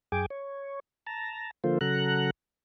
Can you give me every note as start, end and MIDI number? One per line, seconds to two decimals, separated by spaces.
0.12 0.26 42
0.12 0.26 68
0.12 0.26 79
0.12 0.26 80
0.12 0.26 86
0.30 0.80 73
1.07 1.51 81
1.07 1.51 82
1.64 1.78 50
1.64 1.78 53
1.64 1.78 58
1.64 1.78 65
1.64 1.78 69
1.64 1.78 72
1.81 2.30 49
1.81 2.30 54
1.81 2.30 69
1.81 2.30 78
1.81 2.30 82
1.81 2.30 90